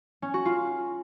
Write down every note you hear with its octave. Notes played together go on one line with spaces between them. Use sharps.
C#4
F#4
F4